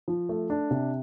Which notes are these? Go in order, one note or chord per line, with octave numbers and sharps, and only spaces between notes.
F3
A3
D4
C3